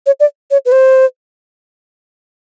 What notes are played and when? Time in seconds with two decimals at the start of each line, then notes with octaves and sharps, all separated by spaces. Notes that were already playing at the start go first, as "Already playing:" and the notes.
0.06 C#5
0.20 D5
0.51 C#5
0.65 B4
0.72 C5